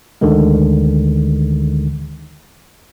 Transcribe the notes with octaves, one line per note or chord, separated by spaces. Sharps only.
D2 D3 D#3 G#3